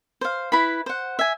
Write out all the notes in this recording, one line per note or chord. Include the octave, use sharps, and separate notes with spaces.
C5 F5
E4 B4 B5
C5 F#5
E5 G#5